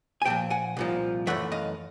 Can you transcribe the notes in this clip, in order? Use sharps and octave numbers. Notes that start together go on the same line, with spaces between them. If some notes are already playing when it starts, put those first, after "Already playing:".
G#5
C2 A#2 F3 G5 A5
F#5 G#5
C2 A#2 F3
F#2 C#3 E3 A3 E5 F#5
D#5 F5